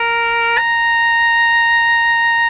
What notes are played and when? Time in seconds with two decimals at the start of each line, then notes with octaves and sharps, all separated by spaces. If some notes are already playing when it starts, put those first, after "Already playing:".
Already playing: A#4
0.58 A#5